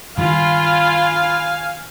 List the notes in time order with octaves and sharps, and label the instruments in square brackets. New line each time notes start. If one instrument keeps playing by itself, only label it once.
[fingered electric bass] G2 D#3 [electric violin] F4 [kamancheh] F5 G#5 [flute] B5